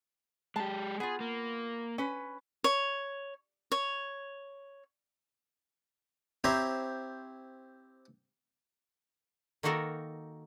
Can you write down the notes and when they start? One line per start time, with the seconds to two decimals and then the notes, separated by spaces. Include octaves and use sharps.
0.56 G#3 G4 A5
1.00 B3 F4 G#4
1.20 A#3
1.98 C#4 B4
2.64 C#5
3.72 C#5
6.44 C4 E4 G4 C5 C#5 A#5
9.63 D#3 A#3 D#4 F#4 A4 A#4